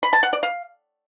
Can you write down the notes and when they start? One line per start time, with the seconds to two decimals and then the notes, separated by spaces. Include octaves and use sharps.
0.03 B5
0.13 A5
0.23 F#5
0.33 D5
0.43 F5